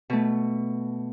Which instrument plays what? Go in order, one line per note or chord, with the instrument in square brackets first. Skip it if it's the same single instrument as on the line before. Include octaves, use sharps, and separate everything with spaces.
[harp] B2 A3